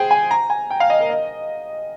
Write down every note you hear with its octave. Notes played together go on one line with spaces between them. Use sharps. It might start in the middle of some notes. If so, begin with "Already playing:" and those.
Already playing: G#4 C5 G5
G#5
A#5
G#5
G5
F5
D#5
A#4
D#5